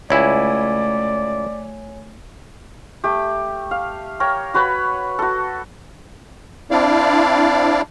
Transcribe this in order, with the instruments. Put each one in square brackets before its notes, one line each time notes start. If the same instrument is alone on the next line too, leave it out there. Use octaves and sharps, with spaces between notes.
[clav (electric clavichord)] C#2 E4 [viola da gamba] A3 [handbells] C#5 G#5 [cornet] D5
[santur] A3 G4
F5
A#4 C#5 G5
F#4 B4 C#5 B5
F#4 A4
[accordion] C4 D4 E4 D5 F5